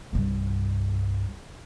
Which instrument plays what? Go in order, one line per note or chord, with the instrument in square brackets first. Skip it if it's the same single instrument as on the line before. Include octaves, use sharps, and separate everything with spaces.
[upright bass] C2 G2